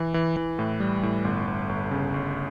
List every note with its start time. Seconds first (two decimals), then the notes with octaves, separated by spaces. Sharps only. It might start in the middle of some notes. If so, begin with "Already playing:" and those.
Already playing: E3
0.14 E3
0.37 E3
0.59 A2
0.80 G3
1.03 A2
1.25 G1
1.48 G1
1.69 G1
1.91 C#3
2.14 G1